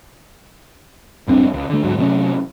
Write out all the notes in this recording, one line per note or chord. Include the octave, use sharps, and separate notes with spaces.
A#1 G2 C4 D4
C#2
D3 A3
D2 G#2 F#3
C3 F#3 A3 C#4